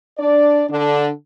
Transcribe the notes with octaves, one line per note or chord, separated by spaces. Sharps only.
D4 D5
D3 D4